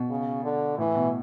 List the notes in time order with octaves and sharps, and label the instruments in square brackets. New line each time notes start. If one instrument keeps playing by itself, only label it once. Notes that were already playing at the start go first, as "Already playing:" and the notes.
Already playing: [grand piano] B2
[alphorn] C#3
D3
[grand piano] A2 [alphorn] E3
[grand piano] B2